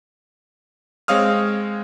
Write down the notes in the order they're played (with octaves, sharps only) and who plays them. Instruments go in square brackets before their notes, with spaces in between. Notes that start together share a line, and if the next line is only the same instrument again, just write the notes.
[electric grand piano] G#3 C4 C#5 F5 D#6 F6